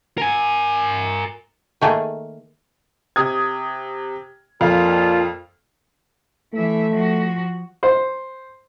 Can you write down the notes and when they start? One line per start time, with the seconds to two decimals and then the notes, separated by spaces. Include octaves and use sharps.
0.18 A#4 G#5
1.81 D#3 A3 A#3 G#4
3.16 C3 D#6 G#6
4.61 F2 A#2 F4 A4 F5
6.53 E3 A3 E5
6.92 F3 F#4
7.83 C5